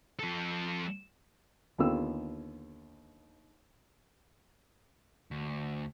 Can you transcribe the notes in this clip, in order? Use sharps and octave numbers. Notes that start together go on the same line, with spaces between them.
F3 A4
D#2 D3 B3 F4 G4 E6
D2